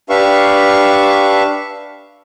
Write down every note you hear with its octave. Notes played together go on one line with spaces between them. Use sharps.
D4 G4 B4 E5 F5 C#6